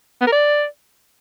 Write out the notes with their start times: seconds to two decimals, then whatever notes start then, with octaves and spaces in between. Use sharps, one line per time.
0.21 B3
0.27 A#4
0.32 D5